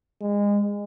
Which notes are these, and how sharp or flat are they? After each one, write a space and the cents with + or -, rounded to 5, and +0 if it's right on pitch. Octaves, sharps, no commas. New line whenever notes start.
G#3 -25